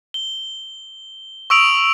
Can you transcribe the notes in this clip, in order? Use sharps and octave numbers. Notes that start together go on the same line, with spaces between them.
G7
C#6 D#6 E6 D7 F7 F#7